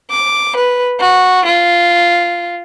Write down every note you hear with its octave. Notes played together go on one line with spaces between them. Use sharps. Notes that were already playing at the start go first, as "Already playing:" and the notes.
D6
B4
F#4
F4